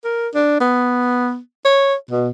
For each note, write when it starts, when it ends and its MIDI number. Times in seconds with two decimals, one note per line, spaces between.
0.05 0.28 70
0.34 0.58 62
0.60 1.38 59
1.65 1.95 73
2.11 2.29 47